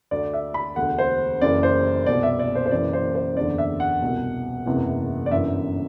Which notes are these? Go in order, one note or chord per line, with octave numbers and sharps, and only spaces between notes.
D2 D3 D5
E5
B5
E1 D2 D3 F#5
C5
F#1 F#2 E3 D5
C5
C2 B2 D5
E5
D5
C5
C5
F#1 F#2 E3 D5
C5
C5
F#1 E2 D3 D5
E5
F#5
C2 B2
F#1 E2 C3 E3
D5
G1 F#2 E3 E5